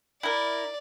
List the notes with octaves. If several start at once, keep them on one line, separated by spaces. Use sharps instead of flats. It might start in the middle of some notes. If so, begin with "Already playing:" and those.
E4 A#4 D5